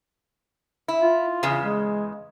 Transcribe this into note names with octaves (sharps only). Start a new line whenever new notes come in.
E4
F4
E2 C#3
G#3